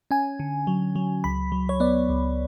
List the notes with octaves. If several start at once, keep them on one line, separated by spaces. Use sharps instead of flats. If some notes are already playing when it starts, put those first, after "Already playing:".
C#4 G#5
D3
F#3
F#3
C#2 B5
F#3
C#5
B3 D5
C#2